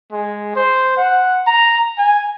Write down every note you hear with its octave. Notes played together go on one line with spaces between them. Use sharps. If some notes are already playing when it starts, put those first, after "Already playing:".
G#3
C5
F#5
A#5
G#5